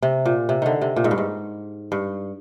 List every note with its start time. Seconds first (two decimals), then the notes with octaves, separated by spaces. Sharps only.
0.02 C3
0.26 A#2
0.49 C3
0.62 D3 D#3
0.82 C3
0.96 A#2
1.04 G#2
1.11 G2
1.18 G#2
1.92 G2